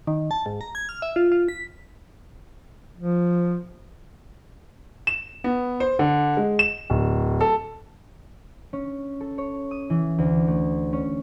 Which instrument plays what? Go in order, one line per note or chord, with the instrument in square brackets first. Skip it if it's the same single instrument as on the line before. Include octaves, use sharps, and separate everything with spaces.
[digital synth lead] D#3
A5
G#2
A#5
G#6
F6
E5
F4
F4
B6
[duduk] F3
[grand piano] E7
B3
C5
D3
G#3
E7
D1
A4
[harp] C#4
A4
C#5
D#6
E3
D2
A3
C#4